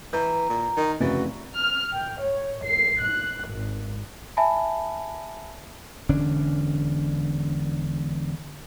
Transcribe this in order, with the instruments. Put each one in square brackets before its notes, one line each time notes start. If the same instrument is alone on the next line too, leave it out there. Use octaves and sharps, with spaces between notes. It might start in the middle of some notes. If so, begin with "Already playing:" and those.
[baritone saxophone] E3 [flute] A#5 [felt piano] G6
[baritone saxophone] A#2
[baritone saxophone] D#3 [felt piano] D#5
[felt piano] F1 C#3 A6 [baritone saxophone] E3 [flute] F#4
[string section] F6
G5
C#5
C7
F#6
G#1
[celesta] E5 G#5 A5 B5
[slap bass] E1 D3 C#4 D4